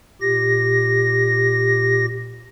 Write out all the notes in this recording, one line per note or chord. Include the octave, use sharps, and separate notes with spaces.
A#2 G4 A#6